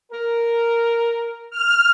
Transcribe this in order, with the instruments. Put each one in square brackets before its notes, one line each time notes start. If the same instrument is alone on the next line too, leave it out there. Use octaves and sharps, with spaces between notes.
[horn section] A#4
[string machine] F6